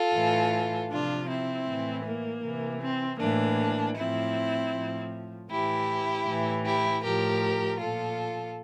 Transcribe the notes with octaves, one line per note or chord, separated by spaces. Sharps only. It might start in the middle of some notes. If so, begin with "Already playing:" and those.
Already playing: F4 A4
A2 E3
C3 F3 D4 F4
C4 E4
A2 E3
A#3
C3 E3
C4
A2 E3 A#3 D4
A2 F3 C4 E4
A2 F3
A2 E3 E4 G4
A2 E3
E4 G4
A2 F3 G4 A#4
A#2 F3 F4 A4